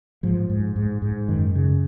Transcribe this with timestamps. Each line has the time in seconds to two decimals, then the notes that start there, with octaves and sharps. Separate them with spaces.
0.23 G#2 F3
0.50 G#2
0.76 G#2
1.02 G#2
1.28 F#2 D#3
1.55 C#3